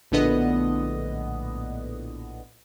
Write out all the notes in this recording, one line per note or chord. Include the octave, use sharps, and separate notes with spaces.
A#1 A2 D3 B3 D#5